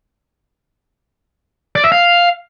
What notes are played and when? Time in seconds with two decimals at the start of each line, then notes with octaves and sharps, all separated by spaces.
1.76 D5
1.84 E5
1.92 F5